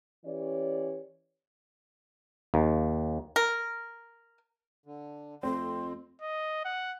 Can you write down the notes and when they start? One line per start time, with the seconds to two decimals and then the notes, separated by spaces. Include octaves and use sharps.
0.24 E3 C#4 G4 C#5 D5
2.54 D#2
3.36 A#4
4.86 D3
5.43 F2 A3 C4 C6
6.22 D#5
6.65 F#5